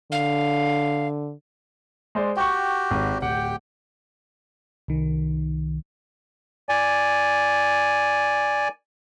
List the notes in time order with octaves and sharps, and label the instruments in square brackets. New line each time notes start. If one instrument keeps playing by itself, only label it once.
[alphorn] D3 [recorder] F5
[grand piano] G#3 C5 D5
[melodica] F#4 G4 [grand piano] G5 C#6
[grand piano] G#1
[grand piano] D1 F#5 [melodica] G4 G5
[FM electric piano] C2 D#3
[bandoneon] D5 G#5